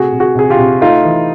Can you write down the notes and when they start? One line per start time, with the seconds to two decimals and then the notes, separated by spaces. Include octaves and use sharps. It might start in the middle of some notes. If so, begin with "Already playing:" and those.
Already playing: C3 A3 F#4 G#4
0.13 C3
0.20 F#4 G#4
0.35 C3 G#4
0.50 F4 G4
0.59 C3
0.81 A3 D#4 F4
1.04 E3